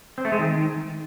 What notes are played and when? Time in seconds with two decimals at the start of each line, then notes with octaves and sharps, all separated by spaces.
0.18 C4
0.25 A3
0.32 G#3
0.39 D#3